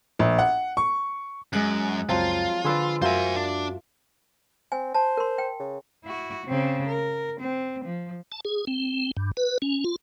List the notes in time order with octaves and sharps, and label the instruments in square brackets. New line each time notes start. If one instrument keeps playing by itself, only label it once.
[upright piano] A#1
F#5
C#6
[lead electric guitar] F#2 [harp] G#3 F#6
[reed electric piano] C#2 F#2 [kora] F3 F#3 C4 [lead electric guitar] F4
[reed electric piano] D3 C6 E6 [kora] G#4 B4 D5
[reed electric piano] F#2 F#4 [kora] F4 A#4 E5 [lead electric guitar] C5 G#5
[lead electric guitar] D4
[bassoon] C4 [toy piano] G#5
[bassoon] C5 [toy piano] A5
[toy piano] A#4 C6
G5
[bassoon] C#3
[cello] E4 F#4
C#3 C4
A#4
C4
F3
[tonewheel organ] A5
G#4
C4
G2
B4
C#4
F4